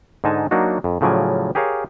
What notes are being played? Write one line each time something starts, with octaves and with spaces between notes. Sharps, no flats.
G#2 D3 G#3 D#4 G#5 A5
F#3 A#3 D4 D#4 F#4
F2
A2 C#3 F3 F#3 D5 G#5
G4 G#4 A#4 C#5 F5